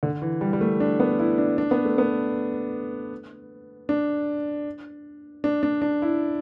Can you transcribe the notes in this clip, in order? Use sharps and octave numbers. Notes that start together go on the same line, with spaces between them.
D3
E3
G3
G3
A3
D4
B3
E4
D4
D4
B3
A3
B3
D4
D4
D4
D4
E4